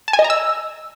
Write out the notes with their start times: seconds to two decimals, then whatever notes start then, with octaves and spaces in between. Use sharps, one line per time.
0.08 A5
0.13 G#5
0.19 D#5
0.24 A#5
0.30 E6